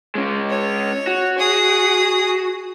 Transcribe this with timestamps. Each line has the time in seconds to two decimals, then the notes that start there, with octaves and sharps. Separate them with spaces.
0.15 G#3 C#4
0.50 C#5
1.07 F#4
1.38 G#4 D#6